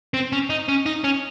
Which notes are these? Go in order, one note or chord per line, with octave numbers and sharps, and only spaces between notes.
C4
C#4
D#4
C#4
D#4
C#4